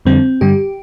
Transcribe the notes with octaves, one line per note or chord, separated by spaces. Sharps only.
F2 D3 G3 C4
G2 D3 G3 G4